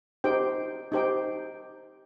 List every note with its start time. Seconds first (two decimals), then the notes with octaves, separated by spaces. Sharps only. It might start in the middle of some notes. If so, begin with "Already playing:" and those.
0.24 D#4 G4 C5 G5
0.92 D#4 G4 C5 G5